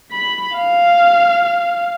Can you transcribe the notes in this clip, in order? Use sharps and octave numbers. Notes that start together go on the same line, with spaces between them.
B5
F5